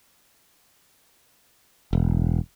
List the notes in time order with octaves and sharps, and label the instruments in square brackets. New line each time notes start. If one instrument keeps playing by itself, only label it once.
[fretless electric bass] E1